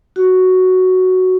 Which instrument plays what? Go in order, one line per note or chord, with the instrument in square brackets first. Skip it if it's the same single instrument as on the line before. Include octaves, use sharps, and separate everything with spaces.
[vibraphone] F#4